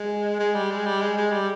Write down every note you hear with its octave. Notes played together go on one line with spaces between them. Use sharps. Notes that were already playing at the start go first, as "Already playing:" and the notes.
Already playing: G#3
G#3
G3
G#3
G3
G#3
G#3
G3